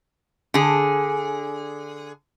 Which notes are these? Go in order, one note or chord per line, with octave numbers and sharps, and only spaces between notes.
D3 G#4